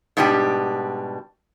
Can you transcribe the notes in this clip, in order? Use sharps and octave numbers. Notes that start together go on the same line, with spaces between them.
G#2 B2 G3 D4 G4